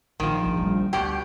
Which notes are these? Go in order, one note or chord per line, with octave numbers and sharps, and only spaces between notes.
A#1 D#3 F3 F#3
A1
G3 A3
D2 G2 B2 G4